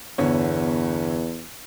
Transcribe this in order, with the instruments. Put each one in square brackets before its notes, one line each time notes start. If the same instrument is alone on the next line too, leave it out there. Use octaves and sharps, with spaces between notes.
[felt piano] G1 D3 C#5 [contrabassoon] E2